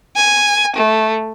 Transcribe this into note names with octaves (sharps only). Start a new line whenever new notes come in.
G#5
A3